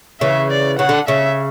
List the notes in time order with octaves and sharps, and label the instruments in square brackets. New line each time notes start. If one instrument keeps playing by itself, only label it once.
[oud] C#3 E3 [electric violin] E5
[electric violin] D5
[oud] C#3 [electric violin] F#5
[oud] D3
[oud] C#3 [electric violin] E5